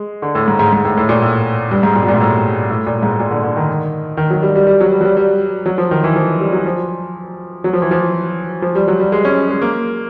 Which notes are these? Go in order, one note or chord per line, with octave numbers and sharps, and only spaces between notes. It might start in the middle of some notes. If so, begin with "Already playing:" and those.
Already playing: G#3
D3
A2
G#2
G#2
G#2
A2
A2
A#2
A2
G2
G#2
A#2
B2
A#2
G#2
A2
A2
A#2
G#2
A#2
D3
D3
D#3
D#3
F#3
G3
G3
G3
F#3
G3
F#3
G3
G3
F#3
F3
D#3
E3
F3
G3
F#3
F3
F#3
F3
E3
F3
F3
G3
F#3
G3
G#3
C#4
G#3
A#3